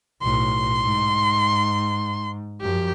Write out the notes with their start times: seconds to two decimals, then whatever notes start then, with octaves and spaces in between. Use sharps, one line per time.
0.22 B1 A2 C6
0.83 G#2
2.61 F#2 F3 G4